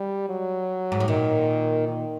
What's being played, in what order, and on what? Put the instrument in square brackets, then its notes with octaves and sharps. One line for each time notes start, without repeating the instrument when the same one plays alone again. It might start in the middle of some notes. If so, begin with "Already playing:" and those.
Already playing: [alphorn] G3
F#3
[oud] G#2
A2
[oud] A#2 [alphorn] D#3
[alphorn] D#3